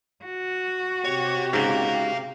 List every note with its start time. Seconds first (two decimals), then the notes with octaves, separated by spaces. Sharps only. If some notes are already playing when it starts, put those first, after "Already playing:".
0.25 F#4
1.04 C3 G4 C#5
1.53 G#2 C#3 F5 A#5